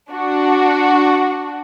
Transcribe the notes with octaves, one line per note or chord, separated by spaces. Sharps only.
D4 F#4